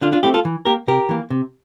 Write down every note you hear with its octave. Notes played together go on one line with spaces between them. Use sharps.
D3 D4 F4
D4 F4
A3 C4 E4 G4
F4 A4
E3
A#3 G4 A#4
C3 G4 A#4
E3 A#3
C3